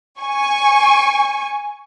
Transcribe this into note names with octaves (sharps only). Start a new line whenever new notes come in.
G#5 C#6